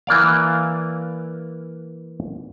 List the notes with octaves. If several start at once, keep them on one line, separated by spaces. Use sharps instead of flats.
E3 A#3 D5 F5